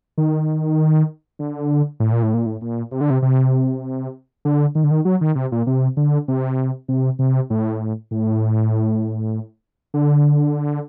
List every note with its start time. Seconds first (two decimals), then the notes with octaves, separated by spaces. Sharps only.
0.18 D#3
1.39 D3
2.00 A2
2.12 A#2
2.23 A2
2.34 A#2
2.46 A2
2.61 A#2
2.91 C3
3.01 D3
3.10 C3
3.22 C3
4.45 D3
4.75 D#3
4.84 D3
4.91 D#3
5.05 F#3
5.21 D#3
5.35 C3
5.52 A#2
5.67 C3
5.97 D3
6.28 C3
6.89 C3
7.19 C3
7.50 A2
8.11 A2
9.94 D3